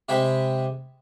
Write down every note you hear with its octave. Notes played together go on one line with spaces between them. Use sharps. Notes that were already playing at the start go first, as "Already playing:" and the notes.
C3 G#3 G5 B5